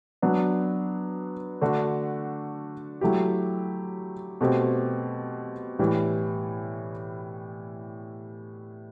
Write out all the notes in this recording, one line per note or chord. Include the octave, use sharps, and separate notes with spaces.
F#3 B3 D4
D3 A3 D4 F#4
F#3 A3 E4 G4
B2 A3 C4 G4
A2 E3 G3